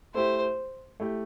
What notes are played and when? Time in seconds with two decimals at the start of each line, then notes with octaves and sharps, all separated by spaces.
0.14 A3 E4 G4 C5
1.00 A3 E4 G4